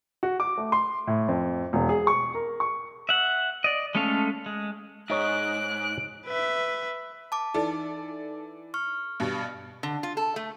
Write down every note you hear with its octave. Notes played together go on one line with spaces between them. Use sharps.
F#4
D6
A3
C6
A2
F2
E1
G#4
C#6
A#4
C#6
E5 F#5
D5 D#5
G#3 A3 C#4 A4 F5
G#3
G#2 D#4 C#5 D#5 F#6 D7
B4 E5
A5 D6
E3 D#4 A4 D5
C#6 F6
G2 B2
D3
F4
A4
A3